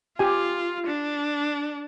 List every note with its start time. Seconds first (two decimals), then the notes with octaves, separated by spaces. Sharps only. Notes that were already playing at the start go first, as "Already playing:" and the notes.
0.19 F4 G4 G#5
0.87 D4